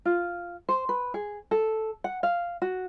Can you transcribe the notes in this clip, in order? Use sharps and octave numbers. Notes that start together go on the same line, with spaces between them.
F4
C5
B4
G#4
A4
F#5
F5
F#4